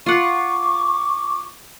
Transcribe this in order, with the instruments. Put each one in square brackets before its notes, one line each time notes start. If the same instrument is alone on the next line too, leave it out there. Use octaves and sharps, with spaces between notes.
[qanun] F4 F#5 [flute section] C#6 D6